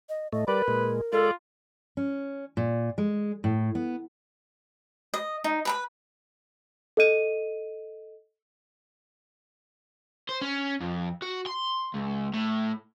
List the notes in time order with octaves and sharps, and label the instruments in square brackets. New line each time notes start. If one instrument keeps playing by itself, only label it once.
[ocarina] D#5
[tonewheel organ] A2 A3 [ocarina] D#5
[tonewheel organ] G3 D5 [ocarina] A#4 [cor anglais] B4
[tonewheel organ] A#2 G#3
[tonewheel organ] G#3 D5 [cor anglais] F4 [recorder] A4
[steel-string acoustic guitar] C#4
A#2
G#3
A2
B3
[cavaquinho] D#5
D#4
B4 A#5 B5
[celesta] A4 D#5 D#7
[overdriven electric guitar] C5
C#4
F2
F#4
C6
C#2
A2